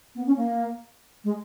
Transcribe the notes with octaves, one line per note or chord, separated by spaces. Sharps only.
B3
C#4
A#3
G#3